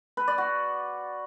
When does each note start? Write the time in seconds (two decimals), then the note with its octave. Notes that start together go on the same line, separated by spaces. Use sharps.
0.17 B4
0.28 D5
0.38 F#4